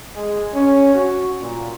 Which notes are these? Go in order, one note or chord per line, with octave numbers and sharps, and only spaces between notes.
G#3
C#4
F#4
A#2